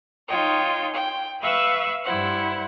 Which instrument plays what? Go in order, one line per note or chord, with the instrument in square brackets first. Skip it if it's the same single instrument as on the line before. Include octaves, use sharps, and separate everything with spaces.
[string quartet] D#4 F4 C#5 D#5 G5
G5
B4 E5 F5 C#6 E6 F#6
G2 E4 C5 F#5